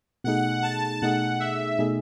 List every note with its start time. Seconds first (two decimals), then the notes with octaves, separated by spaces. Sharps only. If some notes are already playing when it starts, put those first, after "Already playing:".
0.24 B2 A3 D#4 G#4 F#5
0.63 A5
1.02 B2 A3 D#4 G#4 F#5
1.40 E5
1.79 B2 A3 D#4 G#4